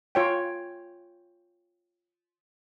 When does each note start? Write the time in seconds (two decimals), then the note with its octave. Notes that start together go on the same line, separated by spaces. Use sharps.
0.15 F4 C#5 G5